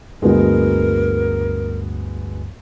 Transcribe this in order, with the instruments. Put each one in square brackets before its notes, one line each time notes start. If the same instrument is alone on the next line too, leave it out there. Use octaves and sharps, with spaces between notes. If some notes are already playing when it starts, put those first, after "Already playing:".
[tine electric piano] D2 G2 [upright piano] G#3 B3 F#4 [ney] A#4